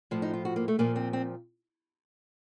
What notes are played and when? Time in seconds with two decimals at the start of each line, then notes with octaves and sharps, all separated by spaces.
0.11 A2 F3
0.22 D#4
0.33 F4
0.45 F#4
0.56 A#3
0.68 A3
0.79 A#2 F3 A#3
0.96 C4
1.13 C4